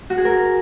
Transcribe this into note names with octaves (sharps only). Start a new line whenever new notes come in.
F#4
G#4
A#4